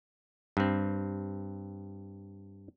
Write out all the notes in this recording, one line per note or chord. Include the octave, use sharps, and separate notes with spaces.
G2 C4